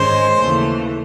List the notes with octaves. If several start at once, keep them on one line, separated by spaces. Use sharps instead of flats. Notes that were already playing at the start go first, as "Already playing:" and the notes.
Already playing: G#2 D#3 G#3 C#4 C5
D#2 C#3 E3 A3